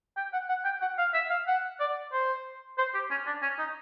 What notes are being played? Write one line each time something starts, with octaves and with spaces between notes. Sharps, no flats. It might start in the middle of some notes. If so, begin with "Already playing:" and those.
G5
F#5
F#5
G5
F#5
F5
E5
F5
F#5
D5
C5
C5
G4
C#4
D4
C#4
D#4